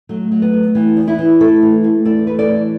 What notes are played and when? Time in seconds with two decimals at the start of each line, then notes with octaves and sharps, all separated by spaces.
0.09 F#3 A3
0.31 F#3
0.42 B3
0.53 A3
0.75 E3 B3
0.97 E2
1.07 B3 E4
1.19 E3
1.40 A3 E4 A4
1.62 E3
1.84 A3
2.05 E2 A4 D5
2.27 A3 B4
2.39 A4 D5
2.50 E3